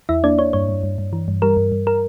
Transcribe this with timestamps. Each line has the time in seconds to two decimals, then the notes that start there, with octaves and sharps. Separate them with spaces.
0.09 E2 E4 E5
0.24 A#3 D4 D5
0.39 D4 C#5
0.53 G2 C#5
0.69 G2
0.83 G2
0.98 G2
1.13 E3
1.28 G2
1.42 G3 A#4
1.57 G2
1.72 G2
1.87 A#4